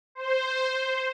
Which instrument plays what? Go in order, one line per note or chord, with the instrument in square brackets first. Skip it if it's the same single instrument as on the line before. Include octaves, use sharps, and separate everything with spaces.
[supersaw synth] C5